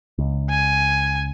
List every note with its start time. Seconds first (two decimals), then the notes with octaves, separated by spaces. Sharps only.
0.18 C#2
0.50 G#5